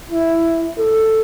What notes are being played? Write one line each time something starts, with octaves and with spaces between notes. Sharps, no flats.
E4
A4